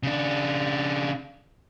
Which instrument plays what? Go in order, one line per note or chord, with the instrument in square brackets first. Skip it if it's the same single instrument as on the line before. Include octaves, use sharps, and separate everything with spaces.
[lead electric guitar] C#3 D4